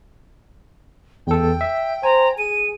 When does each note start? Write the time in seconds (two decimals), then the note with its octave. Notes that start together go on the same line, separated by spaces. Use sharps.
1.27 E2 A4 G5
1.61 E5
2.03 C5 G#5 A#5
2.38 G#4 D#7